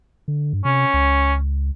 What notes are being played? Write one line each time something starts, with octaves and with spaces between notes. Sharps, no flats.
D3
G2
C3 C#4
C#2